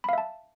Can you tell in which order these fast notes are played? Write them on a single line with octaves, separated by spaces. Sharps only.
B5 F5 E5 A5